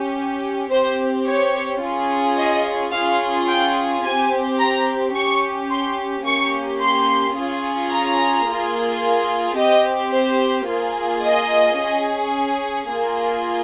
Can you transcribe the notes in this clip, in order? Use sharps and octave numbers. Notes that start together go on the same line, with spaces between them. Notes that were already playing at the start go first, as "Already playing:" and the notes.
Already playing: C#4 G4
C4 G4 C5
C#5
C#4 F4 G#4
D#5
C#4 F4 G#4 F5
G5
C4 G4 G#5
A#5
C#4 G4 C#6
C6
A#3 C#4 G4 C#6
C6
C#4 F4 G#4
A#5
A#3 F4 G#4
C4 G4 D#5
C5
A#3 F4 G#4
D#5
C#4 G#4
A#3 F4 G#4